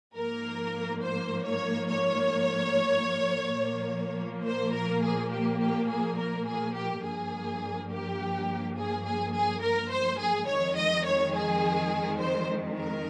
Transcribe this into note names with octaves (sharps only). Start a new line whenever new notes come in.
G#2 F3 A#3 A#4
C5
C#5
C#5
A#2 F3 A#3
C5
A#4
G#4
G4
G4
G#4
A#4
G#4
G4
G2 F3 A#3 G#4
G4
G#4
G#4
G#4
A#4
C5
G#4
F2 D#3 G#3 C#5
D#5
C#5
G#4
C5
A#4